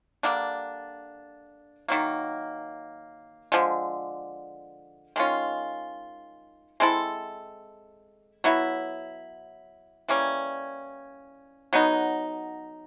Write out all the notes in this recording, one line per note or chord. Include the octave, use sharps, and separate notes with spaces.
D3 G3 A#3 D4
D#3 F#3 A#3
D3 F3 G#3
D#3 G#3 C#4 F4
G#3 C4 E4 A4
F#3 B3 E4
E3 G3 A#3 C#4
F#3 B3 D#4